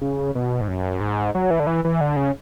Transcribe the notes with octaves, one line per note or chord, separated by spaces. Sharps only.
C#3
B2
G#2
F#2
G#2
F#3
E3
D3
E3
E3
D3
C#3